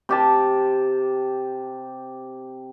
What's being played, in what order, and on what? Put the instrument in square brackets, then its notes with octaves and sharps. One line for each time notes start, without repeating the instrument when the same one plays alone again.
[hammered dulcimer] C3 G4 A5